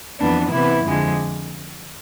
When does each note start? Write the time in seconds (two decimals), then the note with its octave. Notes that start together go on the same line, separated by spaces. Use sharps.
0.20 F2 E3 B3 D4
0.52 C3 E3 B3 E4
0.84 F2 D3 F3 G#3